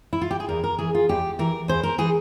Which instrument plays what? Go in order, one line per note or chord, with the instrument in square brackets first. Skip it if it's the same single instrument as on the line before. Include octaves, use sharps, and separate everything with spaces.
[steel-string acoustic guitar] E4
F4
G4
G#4
E2 A#4
A#4
E3 G#4
F4
E2 G4
E3 A#4
E2 C5
A#4
E3 G#4